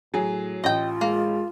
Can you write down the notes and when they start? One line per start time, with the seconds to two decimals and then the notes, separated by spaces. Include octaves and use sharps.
0.14 A2 F#3 G#4
0.64 A1 F4 D#5 G5
1.01 G#3 A#3